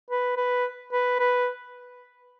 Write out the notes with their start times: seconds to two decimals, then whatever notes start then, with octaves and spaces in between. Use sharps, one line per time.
0.10 B4
0.37 B4
0.92 B4
1.19 B4